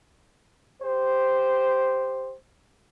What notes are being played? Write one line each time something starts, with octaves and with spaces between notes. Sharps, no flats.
G4 C5